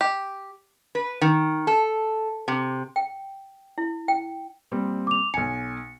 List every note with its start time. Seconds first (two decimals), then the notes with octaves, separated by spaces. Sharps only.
0.01 G4
0.95 B4
1.21 D#3
1.67 A4
2.48 C3
2.96 G5
3.78 E4
4.08 G5
4.71 A#2 G3 C4
5.07 D6 F7
5.34 B1 G#5 C#7